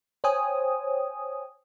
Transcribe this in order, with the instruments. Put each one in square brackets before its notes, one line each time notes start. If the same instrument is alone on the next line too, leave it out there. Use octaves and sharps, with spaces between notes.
[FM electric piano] C5 C#5 G5 G#5 D#6